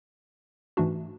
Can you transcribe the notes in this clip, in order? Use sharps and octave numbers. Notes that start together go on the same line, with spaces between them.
G#2 E3 A3 D4 F#4